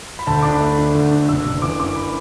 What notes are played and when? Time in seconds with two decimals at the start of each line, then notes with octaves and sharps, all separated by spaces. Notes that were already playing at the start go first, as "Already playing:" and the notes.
0.19 B5
0.27 D2 A5
0.43 D4 D6
0.53 B5
0.61 A3
0.78 D3
0.95 D2
1.11 D4
1.29 F#1 E6
1.46 F#1
1.62 E3 D6
1.80 F#2 D6
1.96 B5